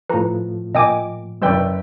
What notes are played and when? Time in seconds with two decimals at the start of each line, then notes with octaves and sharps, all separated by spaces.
0.10 A2 F3 B4 A#5
0.75 A#2 D#5 G5 G#5 D6
1.42 F#1 F#3 B4 D5 G5 E6